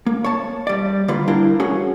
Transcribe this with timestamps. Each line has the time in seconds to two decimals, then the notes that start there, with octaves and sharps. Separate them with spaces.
0.06 A#3
0.24 C#5 A5
0.67 G3 D5
1.08 D3 G3 A#3 F4 B4
1.28 G3 D4 E4 A#4 F5 G5
1.60 C#4 F#4 G#4 C#5